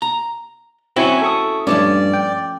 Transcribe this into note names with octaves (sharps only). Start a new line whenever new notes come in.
A#5
C4 C#4 E4 F#4 G#5 C#6
A4 C#6 D#6
G2 F3 A3 C#4 D5
G5